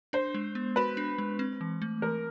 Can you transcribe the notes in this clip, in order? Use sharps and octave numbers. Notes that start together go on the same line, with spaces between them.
D4 C5
G#3
B3
F#4 B4
D4
G#3
C4
E3
A3
E3 A#4